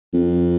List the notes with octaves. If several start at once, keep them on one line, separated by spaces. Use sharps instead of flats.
F2